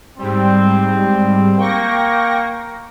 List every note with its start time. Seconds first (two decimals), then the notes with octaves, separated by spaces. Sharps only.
0.18 G#2 G3 C4
1.58 A#3 G5 C#6 A#6